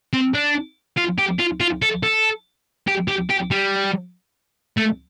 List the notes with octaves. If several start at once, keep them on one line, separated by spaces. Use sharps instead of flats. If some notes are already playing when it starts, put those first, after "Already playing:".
C4
D4
F4
G4
F4
F4
A4
A4
G4
G4
G4
G3
A3